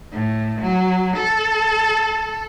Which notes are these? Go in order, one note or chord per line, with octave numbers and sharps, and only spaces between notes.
A2
F#3
A4